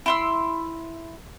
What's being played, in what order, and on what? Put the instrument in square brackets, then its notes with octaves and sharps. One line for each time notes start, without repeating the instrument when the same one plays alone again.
[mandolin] E4 C6 E6